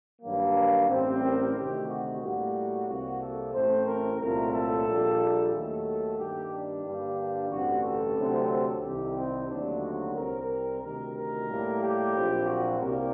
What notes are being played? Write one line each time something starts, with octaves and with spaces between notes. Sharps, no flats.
G2 D#3 F#3 A#3
A1 A2 G3 C4
A#4
D2 C3 D#3 G4
F#4
A2 G3 A#3 F#4
C2 C3 G3 A#3 F#4
A4
A1 A2 A3 C4 C5
A#4
C2 A#2 F#3 A3 C4 A#4
A4
A#1 A#2 G3
D#2 D#3 F#3 A3 A4
G2 D#3 G3 A#3 G4
D4
G2 D3 G3 A#3
A1 G2 D3 G3 C4 F#4
A4
D2 C3 F#3 C4
C2 C3 D#3 G4
C4
D#2 D3 F#3 A3 C4 D4
F#4
C2 C3 G3 C4 A#4
D2 C3 D#3 A#4
A#4
A2 G3 A#3
G4
A#1 A#2 F#3 C4
F#4
C2 C3 G3 A#3 A#4